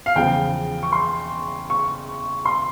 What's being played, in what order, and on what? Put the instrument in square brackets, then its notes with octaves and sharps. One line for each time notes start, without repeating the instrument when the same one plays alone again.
[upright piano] F5
E2 C#3 F3 G5
C#6
C6
C#6
C6